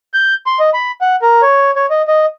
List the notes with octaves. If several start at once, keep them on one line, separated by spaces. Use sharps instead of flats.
G6
C6
D#5
B5
F#5
A#4
C#5
C#5
D#5
D#5